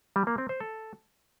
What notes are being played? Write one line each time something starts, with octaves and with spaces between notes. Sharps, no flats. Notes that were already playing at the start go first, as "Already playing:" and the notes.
G3
A#3
C4
C5
A4